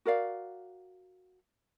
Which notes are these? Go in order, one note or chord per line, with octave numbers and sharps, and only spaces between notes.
F#4 A#4 D5 F5